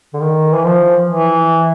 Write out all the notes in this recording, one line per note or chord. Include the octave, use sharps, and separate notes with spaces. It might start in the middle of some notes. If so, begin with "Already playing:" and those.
D3
D#3
E3
F3
E3